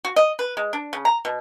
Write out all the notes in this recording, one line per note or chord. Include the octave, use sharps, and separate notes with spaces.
F#4
D#5
B4
G#3
D4
C#3
A#5
B2